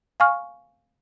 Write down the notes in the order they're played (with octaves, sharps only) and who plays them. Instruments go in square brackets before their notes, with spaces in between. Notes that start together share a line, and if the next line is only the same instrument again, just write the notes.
[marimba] F5 G#5 C#6 F6